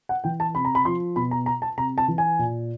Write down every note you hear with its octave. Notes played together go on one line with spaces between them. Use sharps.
F#5
E3 G5
A5
C3 B5
A#5
B5
F3 C6
B2 B5
A#5
A#5
A5
C3 A#5
A5
E3
G#5
A#2